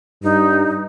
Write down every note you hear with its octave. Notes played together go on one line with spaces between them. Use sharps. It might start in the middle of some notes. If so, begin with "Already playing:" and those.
G2 D#4